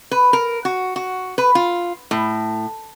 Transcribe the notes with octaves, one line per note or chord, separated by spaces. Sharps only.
B4
A#4
F#4
F#4
B4
F4
A2